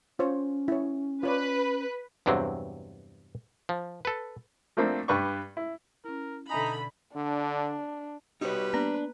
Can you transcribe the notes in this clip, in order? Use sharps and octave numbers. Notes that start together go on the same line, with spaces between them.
C#4 F4 C5 C#5
E4 C#5
F4 B4 C#5 D5
E2 G2 C3 F#3 C4
F3
A4 B4
F3 A3 A#3 C4 D4
G2 B4 D5 G5 C#6
E4
C#4 E4 A#4
B2 D3 D#4 E5 G#5 A#5 B5
D3 D4
G3 D#4 F#4 B4 C#5
A#3 B3 D4 A#5